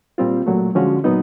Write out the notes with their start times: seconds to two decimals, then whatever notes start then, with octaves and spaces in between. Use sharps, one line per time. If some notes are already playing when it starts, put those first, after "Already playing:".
0.18 A#2 G3 C4 F4
0.46 A#2 F#3 A3
0.75 D3 F3 G#3 C#4 F#4
1.04 A#2 F#3 B3 D#4